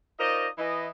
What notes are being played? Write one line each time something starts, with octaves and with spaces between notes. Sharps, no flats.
D#4 F4 A#4 C5 D5 D#5
E3 D#5